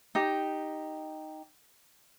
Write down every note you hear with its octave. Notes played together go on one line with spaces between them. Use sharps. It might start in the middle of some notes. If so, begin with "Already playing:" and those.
D#4 G4